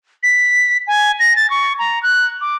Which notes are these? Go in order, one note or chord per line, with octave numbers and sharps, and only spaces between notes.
B6
G#5
A#6
A6
C#6
A#5
F#6
D6